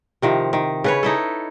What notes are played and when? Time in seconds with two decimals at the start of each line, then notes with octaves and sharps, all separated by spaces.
0.22 C3 D#3 F3
0.53 D#3
0.84 C#3 B4 C#5
1.03 D#4 E4 A4